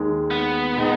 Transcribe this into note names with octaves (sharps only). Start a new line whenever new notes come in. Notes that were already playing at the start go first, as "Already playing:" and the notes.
Already playing: D#2 D#3 G#3
B3
A#2 G#3 D#4